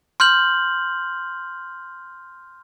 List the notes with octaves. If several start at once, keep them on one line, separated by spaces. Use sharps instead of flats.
C6 F6 G6 F#7